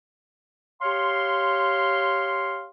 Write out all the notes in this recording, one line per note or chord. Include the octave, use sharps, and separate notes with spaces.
G4 C#5 F5 C6